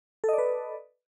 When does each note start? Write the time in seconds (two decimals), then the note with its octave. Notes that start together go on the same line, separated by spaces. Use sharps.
0.24 A4
0.29 D#5
0.33 D5
0.38 B4